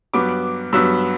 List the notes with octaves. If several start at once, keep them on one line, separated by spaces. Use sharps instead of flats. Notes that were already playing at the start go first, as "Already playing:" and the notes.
G2 F#3 B3 D6
G2 F#3 B3 E6